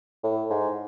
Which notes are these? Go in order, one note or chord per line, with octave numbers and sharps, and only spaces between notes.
A2
G#2